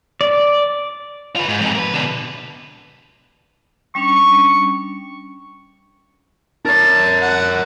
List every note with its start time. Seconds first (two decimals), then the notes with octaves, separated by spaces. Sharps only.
0.21 D5
1.36 F4 B4
1.48 G#2
1.61 F2 G#2
1.75 A#4 B4
1.94 B2 D3
3.95 G3 C#4 D4 C#6
6.66 A#4 C#5 A5
7.22 F#5